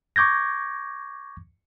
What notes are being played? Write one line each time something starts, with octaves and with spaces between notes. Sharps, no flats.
C#6 D6 G6 G#6 A#6